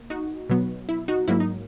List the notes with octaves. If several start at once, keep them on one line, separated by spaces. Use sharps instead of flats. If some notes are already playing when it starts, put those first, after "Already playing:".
Already playing: A#3
D#4 F#4
B2 F#3 B3
E4
D#4 F#4
G#2 F#3 A#3 E4
D#4